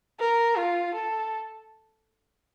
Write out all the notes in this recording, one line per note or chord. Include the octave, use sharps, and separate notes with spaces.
A#4
F4
A4